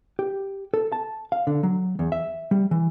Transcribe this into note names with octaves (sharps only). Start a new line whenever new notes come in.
G4
A4
A5
F5
D3
F#3
E2
E5
G3
E3